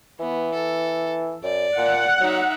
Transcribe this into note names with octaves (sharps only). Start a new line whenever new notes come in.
E3 B3
A4
F#2 D5
A#2 F#5
F#3 D#4 E5